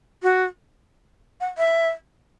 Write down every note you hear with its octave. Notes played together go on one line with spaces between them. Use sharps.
F#4
F#5
E5